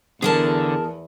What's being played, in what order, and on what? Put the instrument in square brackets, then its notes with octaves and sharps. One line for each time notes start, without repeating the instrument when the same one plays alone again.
[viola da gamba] E2 [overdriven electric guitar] D3 [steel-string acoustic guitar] G#4 A#4 A5